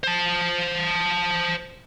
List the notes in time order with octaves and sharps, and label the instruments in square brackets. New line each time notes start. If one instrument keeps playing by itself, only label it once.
[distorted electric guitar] C5 A5